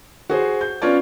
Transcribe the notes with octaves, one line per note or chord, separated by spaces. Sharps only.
F#4 G#4 C5
G6
B3 C#4 F4 C#5 D5